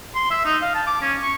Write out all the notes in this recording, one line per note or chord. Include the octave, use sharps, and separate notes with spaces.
C6
E5
D#4
F5
A5
D6
C#4
C#6